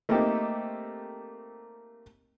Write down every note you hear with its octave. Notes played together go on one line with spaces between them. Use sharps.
A3 A#3 C4 D#4 G4 A4